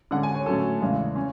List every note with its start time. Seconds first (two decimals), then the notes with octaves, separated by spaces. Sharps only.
0.11 D3 G#3 C#4 F#5
0.23 G#5
0.35 C#5
0.46 D3 F#3 A3 C#4 A4
0.81 E2 C#3 G#3
1.16 C#4